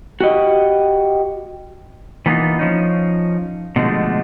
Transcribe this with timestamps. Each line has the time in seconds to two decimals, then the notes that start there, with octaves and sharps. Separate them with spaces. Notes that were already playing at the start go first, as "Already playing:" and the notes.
0.21 F#4 G4 D#5
2.26 E3 A#3 B3 C#4 D#4 F4
2.59 F3 C#4 D#4
3.76 B2 D3 F3 G#3 A3